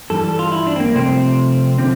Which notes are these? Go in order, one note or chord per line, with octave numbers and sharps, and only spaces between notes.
G2 E3 G3 A4
A4
F4
E4
D4
C4
A#3
C2 C3 F3 A3 C4
D3 F3 C4